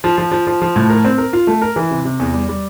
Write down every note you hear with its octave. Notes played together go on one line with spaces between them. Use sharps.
F3
F3
F3
F3
F3
A2
A#4
C4
A#4
F4
A3
A#4
E3
C3
C3
E2
G3
G3